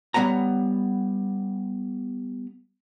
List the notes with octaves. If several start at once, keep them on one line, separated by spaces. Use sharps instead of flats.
G3 B3 C#5 F#5 A#5